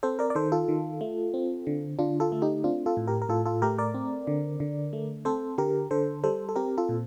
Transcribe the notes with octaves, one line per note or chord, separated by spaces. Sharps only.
C4 A4 C5
A#4 D5
D5
D#3 A4 C5
F4 A4
D#3
A3
C4
D3
D3 D4 F4
F4 A4
A3
D#4 G4
C4 D4 F4
F4 A4
A2
G4 A#4
A#4
A2 F4 A4
F4 A4
A3 G4 A#4
A#4 D5
C4
D3
D3
A3
C4 A4 C5
D3 G4 A#4
D3 A4 C5
G3 A4 C5
A4
C4 G4 A#4
F4 A4
A#2